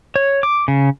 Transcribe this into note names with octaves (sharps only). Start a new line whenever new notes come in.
C#5
D6
C#3